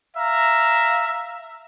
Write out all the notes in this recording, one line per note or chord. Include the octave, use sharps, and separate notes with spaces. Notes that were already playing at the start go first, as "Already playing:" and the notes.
E5 F5 A#5